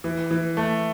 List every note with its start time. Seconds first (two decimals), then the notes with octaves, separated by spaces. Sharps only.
0.04 E3
0.31 E3
0.57 A3